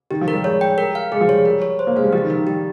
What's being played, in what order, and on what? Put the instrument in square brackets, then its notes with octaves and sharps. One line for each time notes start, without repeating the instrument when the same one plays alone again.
[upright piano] D#3 [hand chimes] G4
[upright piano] F3
[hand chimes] A#4
[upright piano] G3
[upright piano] G#3 [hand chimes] C#5
[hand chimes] G5
A#4
F5
[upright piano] G#3 [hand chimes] G#4
[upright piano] F3
[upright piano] G3 [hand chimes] C#5
[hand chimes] A#4
C#5
C5
[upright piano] A#3
[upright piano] G#3 [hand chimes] F5
[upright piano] G3
[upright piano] F3 [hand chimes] G4
[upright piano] D#3
[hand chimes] A#4
[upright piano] D#3
[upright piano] G3 [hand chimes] G4